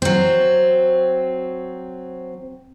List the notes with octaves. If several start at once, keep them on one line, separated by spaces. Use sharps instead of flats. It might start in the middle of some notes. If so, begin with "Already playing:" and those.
F#3 C4